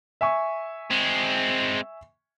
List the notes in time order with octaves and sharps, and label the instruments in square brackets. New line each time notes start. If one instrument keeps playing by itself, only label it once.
[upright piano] E5 G#5 C#6
[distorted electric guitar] G#3 C4